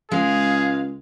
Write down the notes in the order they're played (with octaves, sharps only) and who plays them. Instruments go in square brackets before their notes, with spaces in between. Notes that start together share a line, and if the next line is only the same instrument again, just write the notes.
[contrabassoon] C#2 [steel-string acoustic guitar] G#3 [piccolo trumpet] G#4 [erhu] F5